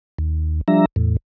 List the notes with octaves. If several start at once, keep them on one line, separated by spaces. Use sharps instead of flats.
D#2
F3 G3 D4 E5 A#5
E2 A2